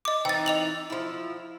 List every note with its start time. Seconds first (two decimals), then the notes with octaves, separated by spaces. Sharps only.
0.05 D#5 D6
0.25 E3 C4 D#4 G5 A6
0.46 D#5 F7 F#7
0.90 F3 E4